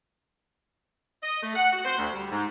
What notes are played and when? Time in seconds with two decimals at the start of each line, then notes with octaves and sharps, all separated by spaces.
1.23 D#5
1.42 A3
1.56 F#5
1.72 F#4
1.85 C5
1.98 D2
2.13 G3
2.31 G#2